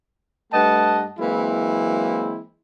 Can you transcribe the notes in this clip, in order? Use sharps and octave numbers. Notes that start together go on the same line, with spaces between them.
G2 A3 B4 D#5 F#5 A5
E3 F#3 G#3 A#3 C4 E4